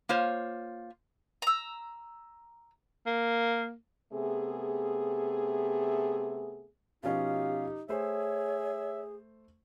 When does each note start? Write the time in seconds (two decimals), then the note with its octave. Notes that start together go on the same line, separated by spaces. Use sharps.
0.09 A#3 F4 C5 C#5
1.42 A#5 E6
3.06 A#3
4.13 C3 A3 B3 G#4
7.03 B2 F3 C#4 D#4 G4 F5
7.89 A3 G#4 C5 C#5 E5